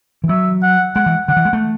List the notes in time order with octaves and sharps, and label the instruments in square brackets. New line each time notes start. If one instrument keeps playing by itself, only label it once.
[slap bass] E3
[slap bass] F#3 [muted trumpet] E5
[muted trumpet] F#5
[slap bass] G#3 [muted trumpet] F#5
[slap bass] E3
[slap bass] D3 [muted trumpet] F#5
[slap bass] E3
G#3
A3